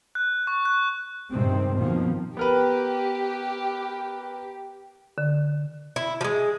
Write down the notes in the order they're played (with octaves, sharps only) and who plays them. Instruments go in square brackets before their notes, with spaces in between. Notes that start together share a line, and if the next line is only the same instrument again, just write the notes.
[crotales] F#6
C#6
F#6
[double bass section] G2 C3 D#3 G#3 C4
B2 D#3 F3 A#3 C4
[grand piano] B3 A#4 B4 [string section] G4
[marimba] D3
[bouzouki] E4
F3 G#3